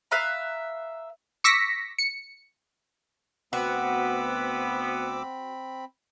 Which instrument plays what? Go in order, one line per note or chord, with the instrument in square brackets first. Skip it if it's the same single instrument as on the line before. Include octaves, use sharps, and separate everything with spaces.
[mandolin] B4 E5 F5 A#5
[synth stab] C#6 D6 E6 A#6 B6 C#7
C#7
[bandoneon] D2 D6 E6 [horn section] B3 [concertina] C4 B5 [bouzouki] F#4